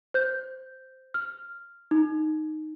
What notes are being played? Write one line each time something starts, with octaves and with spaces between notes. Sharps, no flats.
C5 G6
F6
D#4